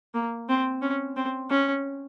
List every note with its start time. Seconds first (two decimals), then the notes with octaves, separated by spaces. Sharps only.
0.14 A#3
0.49 C4
0.82 C#4
1.16 C4
1.50 C#4